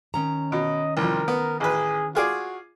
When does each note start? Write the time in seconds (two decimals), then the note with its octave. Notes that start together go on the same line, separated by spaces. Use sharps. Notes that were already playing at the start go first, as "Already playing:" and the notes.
0.14 D#3 C#4 A#5
0.52 B2 D#5
0.97 C2 F2 A#4
1.28 B3
1.60 A1 G#4 B4
2.15 F4 F#4 G#4 D5